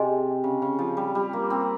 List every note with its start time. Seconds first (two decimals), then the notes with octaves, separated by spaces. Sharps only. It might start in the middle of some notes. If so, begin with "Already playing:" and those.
Already playing: C3 G#4 D#5 G#5 C6
0.44 C#3
0.62 C#3
0.79 F3
0.97 G3
1.15 G3
1.33 A#3
1.50 C4